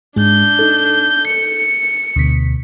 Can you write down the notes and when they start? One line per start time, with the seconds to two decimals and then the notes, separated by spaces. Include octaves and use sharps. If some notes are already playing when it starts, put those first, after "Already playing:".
0.16 G#2 G#3 D4 G6
0.59 D#4 A4
1.27 C#7
2.16 D2 B2 B6